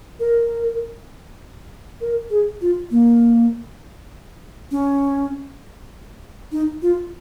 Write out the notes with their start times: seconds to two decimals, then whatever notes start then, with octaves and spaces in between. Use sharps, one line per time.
0.20 A#4
2.01 A#4
2.30 G#4
2.61 F4
2.91 A#3
4.71 C#4
6.52 D#4
6.82 F4